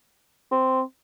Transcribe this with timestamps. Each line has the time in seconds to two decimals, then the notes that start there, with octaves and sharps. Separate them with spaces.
0.51 C4